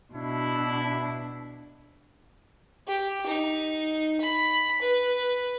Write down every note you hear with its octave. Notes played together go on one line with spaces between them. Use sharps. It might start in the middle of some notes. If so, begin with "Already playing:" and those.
B2 D4 E4
G4
D#4
B5
B4